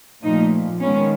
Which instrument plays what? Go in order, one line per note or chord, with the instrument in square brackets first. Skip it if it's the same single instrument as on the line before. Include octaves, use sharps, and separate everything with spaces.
[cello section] A#2 F3 A3 D#4
D#3 G#3 B3 C#4